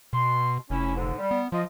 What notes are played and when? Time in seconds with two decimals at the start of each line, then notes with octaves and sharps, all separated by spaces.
0.13 B2 C6
0.70 F1 C#4 E4
0.96 G#2 D3
1.19 G3
1.31 B3
1.52 F3 F4 D#5